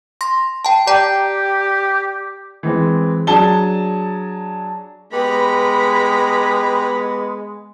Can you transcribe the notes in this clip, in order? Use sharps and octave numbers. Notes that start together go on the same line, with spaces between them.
C6 A#6
G5 A5
G4 D5 G5 A#5
E3 G#3 C4
F#3 D4 G#4 G#5 A5 G7
G#3 B3 G4 B4 A#5 B5